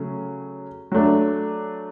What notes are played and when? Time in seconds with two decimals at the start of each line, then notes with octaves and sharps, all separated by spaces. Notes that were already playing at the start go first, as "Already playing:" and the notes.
Already playing: C#3 F#3 A3 C#4
0.92 F#3 A3 D4